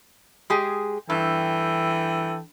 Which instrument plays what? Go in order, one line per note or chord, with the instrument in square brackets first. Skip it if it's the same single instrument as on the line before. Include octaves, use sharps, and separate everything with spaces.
[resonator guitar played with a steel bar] G#3 G4 G#4
[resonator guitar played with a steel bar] G2 [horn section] E3 A4 G5